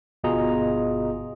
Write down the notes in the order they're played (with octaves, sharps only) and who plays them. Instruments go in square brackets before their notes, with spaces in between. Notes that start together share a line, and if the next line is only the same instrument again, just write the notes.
[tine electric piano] G1 B2 F4 G#4 D#5 A#5